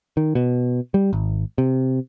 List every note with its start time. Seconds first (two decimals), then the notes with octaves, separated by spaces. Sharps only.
0.17 D#3
0.35 B2
0.94 G3
1.13 G#1
1.58 C3